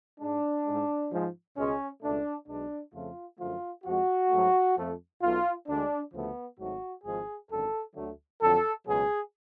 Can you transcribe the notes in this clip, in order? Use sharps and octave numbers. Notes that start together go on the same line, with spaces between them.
G#2 G#3 D4
G#2 G#3
G#2 F3 G#3
C#2 B2 G#3 C#4
C#2 B2 A3 D4
B1 B2 G#3 D4
F2 C#3 F3 A3 F4
F#2 D3 F3 A3 F4
F2 F3 G#3 F#4
G#2 F#3 A3
F2 F3 A3
B1 B2 A3 F4
D2 D3 G#3 D4
D2 C#3 F3 A3 B3
G#1 G#2 F#3 A3 F#4
G#1 G#2 F3 G#3 G#4
G#1 F#2 D3 A4
D2 D3 F#3 A3
F2 D3 F#3 A4
C#2 B2 F#3 G#4